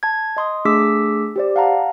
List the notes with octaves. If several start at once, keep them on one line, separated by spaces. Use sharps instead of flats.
A5 G#6
D#5 C6 D#6
A3 D4 G#4 D6 E6 B6
G4 C5 D5
F5 F#5 A5 A#5